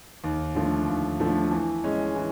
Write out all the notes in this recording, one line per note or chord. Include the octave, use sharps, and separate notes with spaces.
D#2
D3 F3 A3
D#2
D3 F3 A3
E3
G#3 C#4
E3